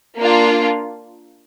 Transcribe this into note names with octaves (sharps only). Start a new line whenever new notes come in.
A#3 D4 F4